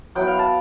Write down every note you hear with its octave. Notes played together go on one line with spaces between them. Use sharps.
F#3 B3 E4 G5
F5
A5